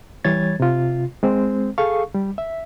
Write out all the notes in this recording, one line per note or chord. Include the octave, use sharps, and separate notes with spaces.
E3 G3 C#5 G#6 A6
C3 F4
G#3 C4 C5
G#4 A4 F5 C#6
G3
E5